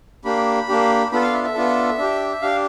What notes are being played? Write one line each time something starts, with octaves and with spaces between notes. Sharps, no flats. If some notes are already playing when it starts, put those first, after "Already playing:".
A#3 D4 G4 B5
A#3 D4 G4
B3 D4 F4 A4 B5
F5
E5
E5
B3 D4 F4 A4
D4 G4
D4 G4 F5